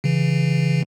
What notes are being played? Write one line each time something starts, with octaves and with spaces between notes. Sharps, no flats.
C#3 E3